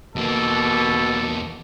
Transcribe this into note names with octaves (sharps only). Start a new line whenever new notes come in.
E2 B2 A#3 A4